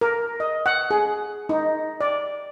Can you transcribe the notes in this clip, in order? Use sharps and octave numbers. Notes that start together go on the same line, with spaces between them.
A#4
D#5
F#5
G#4
D#4
D5